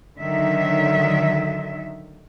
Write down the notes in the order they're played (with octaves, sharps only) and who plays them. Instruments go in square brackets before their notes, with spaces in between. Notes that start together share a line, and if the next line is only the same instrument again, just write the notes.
[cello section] D3 D#3 F#3 E5